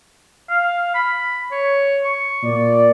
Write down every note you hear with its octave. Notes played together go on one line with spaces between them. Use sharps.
F5
B5
C#5
C#6
A#2 D5